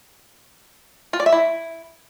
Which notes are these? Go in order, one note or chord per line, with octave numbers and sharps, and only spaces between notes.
F4
D5
E5
E4